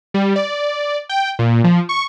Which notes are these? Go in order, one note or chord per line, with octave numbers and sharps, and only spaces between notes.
G3
D5
G5
A#2
F3
C#6